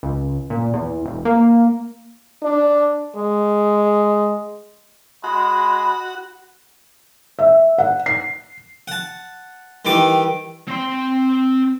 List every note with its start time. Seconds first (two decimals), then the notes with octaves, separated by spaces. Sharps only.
0.03 C#2
0.50 A#2
0.73 E2
1.05 E1
1.25 A#3
2.42 D4
3.16 G#3
5.24 G#3 F#4 B5
7.39 E5
7.78 F#5
8.06 C7
8.88 F#5 A5
9.85 D#3 E3 G3 D6
10.68 C4 C6